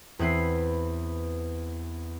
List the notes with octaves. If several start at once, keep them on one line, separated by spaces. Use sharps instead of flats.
E2 C4 B4 C7